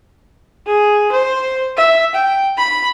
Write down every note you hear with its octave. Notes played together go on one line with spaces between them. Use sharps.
G#4
C5
E5
G5
B5